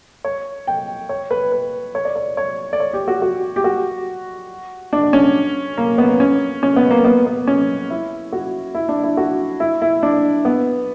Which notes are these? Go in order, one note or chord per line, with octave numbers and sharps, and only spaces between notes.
C#5
G5
C#5
B4
B4
C#5
D5
C#5
C#5
D5
C#5
G4
F#4
F#4
G4
F#4
D4
C#4
A#3
B3
C#4
C#4
B3
A#3
B3
B3
C#4
E4
F#4
E4
D4
E4
F#4
E4
E4
D4
B3